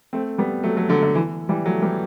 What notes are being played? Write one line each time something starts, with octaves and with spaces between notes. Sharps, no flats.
A3 C4
G3 B3
F#3 A3
F#3 A3
D3 F#3
D3
E3
E3 G3
F#3 A3
G3 B3